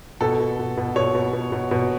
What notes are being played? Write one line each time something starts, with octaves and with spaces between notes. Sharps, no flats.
B2 A4
B2
B2
B2
B2 C#5
B2
B2
B2
B2